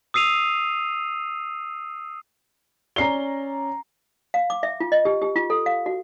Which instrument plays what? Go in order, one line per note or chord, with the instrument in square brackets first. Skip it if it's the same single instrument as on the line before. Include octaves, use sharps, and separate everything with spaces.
[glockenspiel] D#6 E6 C7 D#7 F7
[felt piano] C#4 D5 [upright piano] A#5 C7 G7
[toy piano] F5
D6
E5
F4
D#5
G4
G4
F4
A4
F5
F#4